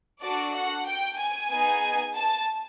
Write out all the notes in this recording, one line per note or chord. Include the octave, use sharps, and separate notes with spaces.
D4 F#4 A4 D5
F#5
G5
G#5
B3 D#4 G#4
A5